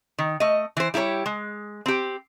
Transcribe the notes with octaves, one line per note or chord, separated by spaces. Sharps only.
D#3
A3 D#5
E3 C5
G3 E4 G4 A#4 C#5
G#3
C4 G4